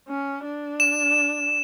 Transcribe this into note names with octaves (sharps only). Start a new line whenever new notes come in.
C#4
D4
E7